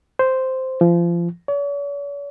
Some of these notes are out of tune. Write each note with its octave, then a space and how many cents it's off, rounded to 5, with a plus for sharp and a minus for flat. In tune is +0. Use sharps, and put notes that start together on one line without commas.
C5 -5
F3 -30
C#5 +45